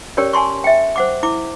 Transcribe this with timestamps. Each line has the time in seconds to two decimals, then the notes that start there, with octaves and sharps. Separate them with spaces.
0.17 C#4 G4 A#4 C#5 D5
0.33 G#5 A5 C6 C#6
0.64 E5 G5
0.96 C5 F#5 D6
1.23 E4 D6